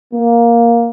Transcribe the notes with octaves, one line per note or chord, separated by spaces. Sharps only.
A#3